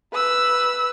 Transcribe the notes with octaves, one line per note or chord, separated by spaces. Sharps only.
B4 E6